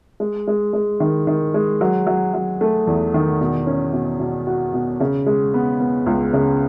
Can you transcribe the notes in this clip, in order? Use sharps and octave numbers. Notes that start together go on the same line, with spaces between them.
G#3
G#3
G#3
D#3
D#3
G#3
F#3
F#3
F#3
A3
E2
D#3
B2
C#4
B2
B2
F#4
B2
C#3
G#3
B3
B3
C#2
C#3